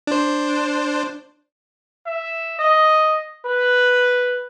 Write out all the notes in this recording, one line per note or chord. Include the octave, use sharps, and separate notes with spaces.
D4 C5
E5
D#5
B4